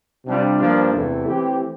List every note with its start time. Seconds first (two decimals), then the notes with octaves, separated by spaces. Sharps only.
0.25 C3 G3 D4 F4
0.59 G2 F3 A#3 D4 F4
0.93 E2 C3 E3 A3 E4
1.26 E3 A3 C4 G4